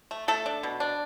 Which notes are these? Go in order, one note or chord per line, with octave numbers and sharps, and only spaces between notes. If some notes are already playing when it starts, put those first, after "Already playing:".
A3
A3 A4
D4
B2
D4